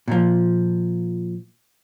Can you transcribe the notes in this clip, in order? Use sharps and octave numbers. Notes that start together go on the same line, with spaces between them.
A#2 F3